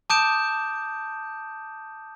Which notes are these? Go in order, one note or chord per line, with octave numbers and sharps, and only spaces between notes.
A5 D6 D#6 G6 D7 E7